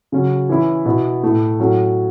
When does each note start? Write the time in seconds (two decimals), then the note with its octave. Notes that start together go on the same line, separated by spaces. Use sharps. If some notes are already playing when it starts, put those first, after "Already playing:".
0.12 C#3 F#3 C#4
0.49 E3 C#4 E4
0.85 B2 B3 E4
1.23 A2 A3 E4
1.59 A2 F#3 C#4